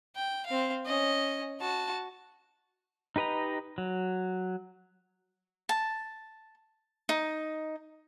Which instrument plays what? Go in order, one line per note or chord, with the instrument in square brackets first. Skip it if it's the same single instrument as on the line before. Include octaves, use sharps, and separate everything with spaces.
[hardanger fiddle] G5
C4 F5
C#4 D#5
F#4 A5
[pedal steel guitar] D#4 G4 B4 D#5 A#5
F#3
[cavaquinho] A5
D#4